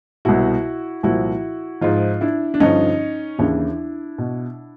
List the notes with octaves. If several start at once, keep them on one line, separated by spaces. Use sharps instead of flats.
C2 B2 E4 F#4
C2 A#2 F3 E4 F#4
G#2 F3 D#4 F4
D4 E4
D4
G2 D3 F3 C#4 D#4
D#2 C#3 E3 D4 E4
B2